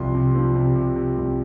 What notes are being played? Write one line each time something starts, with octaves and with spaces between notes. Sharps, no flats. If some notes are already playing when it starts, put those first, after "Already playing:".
Already playing: C2 F3 C6
C3
F3
C3
C3
C3
C2